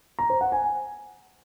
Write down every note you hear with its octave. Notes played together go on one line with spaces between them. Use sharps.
A#5
C5
F#5
G#5